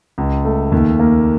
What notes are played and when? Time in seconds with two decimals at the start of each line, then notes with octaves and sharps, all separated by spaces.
0.18 C#2
0.45 A3
0.72 D#2
0.99 A#3